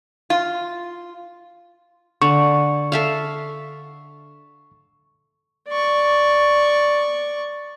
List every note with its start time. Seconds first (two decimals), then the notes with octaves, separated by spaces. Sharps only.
0.30 F4
2.22 D3 C#6
2.92 A4 E5 F5
5.68 D5 C#6